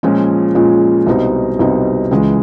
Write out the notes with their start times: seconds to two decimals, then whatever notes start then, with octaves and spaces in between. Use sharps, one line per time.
0.03 A#2 F3 G#3 C#4
0.55 A#2 F3 G#3 C#4
1.07 C2 B2 G3 C4 D#4
1.59 C2 B2 G3 C4 D#4
2.11 C#2 C#3 E3 G#3